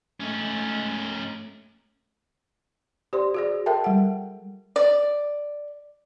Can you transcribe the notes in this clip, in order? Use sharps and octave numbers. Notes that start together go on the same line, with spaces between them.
A3 C#4 D#4
G4 C5 D5 C6
F#4 G#4 D5
A4 A#4 E5 G5 A5
G3 F#5
D5